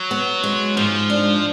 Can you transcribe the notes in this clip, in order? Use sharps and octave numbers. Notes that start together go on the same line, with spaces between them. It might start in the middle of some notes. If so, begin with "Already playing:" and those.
Already playing: F#3
B3
G#3
G#2 F3
D4